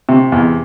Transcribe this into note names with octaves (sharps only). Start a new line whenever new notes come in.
C3
E2